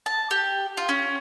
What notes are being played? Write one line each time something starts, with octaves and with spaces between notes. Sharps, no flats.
A5
G4
F4
C#4